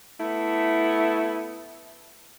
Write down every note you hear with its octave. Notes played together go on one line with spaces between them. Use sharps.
A3 B3 E4